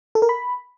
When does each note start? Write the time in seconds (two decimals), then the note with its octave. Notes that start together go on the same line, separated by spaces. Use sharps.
0.15 A4
0.22 A#4
0.29 B5